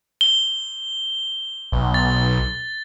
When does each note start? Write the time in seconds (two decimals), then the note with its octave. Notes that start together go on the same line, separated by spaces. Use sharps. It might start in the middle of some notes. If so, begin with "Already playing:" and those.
0.21 G7
1.72 B1
1.94 A6